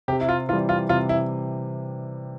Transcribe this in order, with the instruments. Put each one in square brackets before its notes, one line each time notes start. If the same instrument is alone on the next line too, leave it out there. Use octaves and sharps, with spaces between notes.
[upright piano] C3 [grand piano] G4
[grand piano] E4
F4
[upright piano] E3 [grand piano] F4
[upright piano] G3
[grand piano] F4
[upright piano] C3 [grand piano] F4
[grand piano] E4